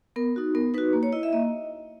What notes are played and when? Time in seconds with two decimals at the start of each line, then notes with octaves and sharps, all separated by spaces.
0.16 B3 A#4
0.36 D#4 F#4
0.55 B3 A#4
0.74 D#4 F#4 B4
0.93 A#3
1.03 C#5
1.13 E4 D#5
1.23 E5
1.33 A#3 D#5